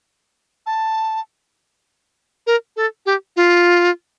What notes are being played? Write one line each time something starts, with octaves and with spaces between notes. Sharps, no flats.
A5
A#4
A4
G4
F4